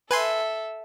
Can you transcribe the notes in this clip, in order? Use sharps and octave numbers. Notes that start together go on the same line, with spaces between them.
A4 B4 E5 G#5 C6